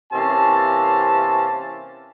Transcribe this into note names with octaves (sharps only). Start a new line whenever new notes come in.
C3 E3 A#3 C4 C#4 A5